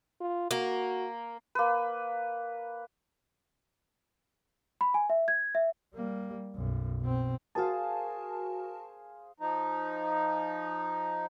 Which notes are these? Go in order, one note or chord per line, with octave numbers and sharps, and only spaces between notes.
F4
A#3 F#4
A#3 B4
B5
G#5
E5
G#6
E5
G3 A#3
B1 F#2
B2 C4
F#4 G#4 A#4 C5 F5 A5
F3 D#4